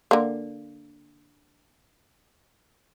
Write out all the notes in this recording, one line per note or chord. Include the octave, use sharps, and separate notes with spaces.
D3 A#3